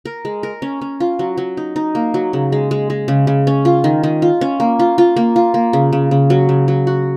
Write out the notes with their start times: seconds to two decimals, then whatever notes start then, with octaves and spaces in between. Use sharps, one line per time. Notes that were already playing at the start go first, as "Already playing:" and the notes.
0.05 A#4
0.25 G#3
0.43 A#4
0.62 C#4
0.81 C#4
1.00 F4
1.19 F#3
1.38 F#3
1.57 D#4
1.76 D#4
1.95 A#3
2.14 F#3
2.33 C#3
2.52 G#3
2.71 G#3
2.90 G#3
3.08 C#3
3.27 C#3
3.47 C#4
3.65 F4
3.84 D#3
4.04 D#3
4.22 F4
4.41 C#4
4.60 A#3
4.79 F4
4.98 F4
5.17 A#3
5.36 F4
5.54 A#3
5.73 C#3
5.93 C#3
6.11 C#3
6.30 F#3
6.49 C#3
6.68 F#3
6.87 F#4